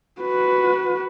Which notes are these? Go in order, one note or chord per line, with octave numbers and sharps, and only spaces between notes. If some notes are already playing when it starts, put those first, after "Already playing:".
F#4 B4